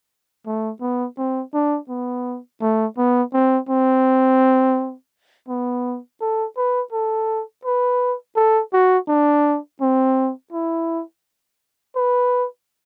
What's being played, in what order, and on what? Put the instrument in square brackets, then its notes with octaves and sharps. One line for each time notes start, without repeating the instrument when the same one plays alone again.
[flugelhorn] A3
B3
C4
D4
B3
A3
B3
C4
C4
B3
A4
B4
A4
B4
A4
F#4
D4
C4
E4
B4